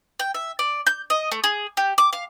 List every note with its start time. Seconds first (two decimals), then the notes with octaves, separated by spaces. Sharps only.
0.20 G5
0.34 E5
0.59 D5
0.87 G6
1.10 D#5
1.32 A3
1.44 G#4
1.77 G4
1.98 D6
2.13 F5